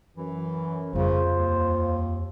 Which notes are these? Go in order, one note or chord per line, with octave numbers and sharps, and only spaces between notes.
F#2 E3
F2 C#3 G3 F4 C5
D#2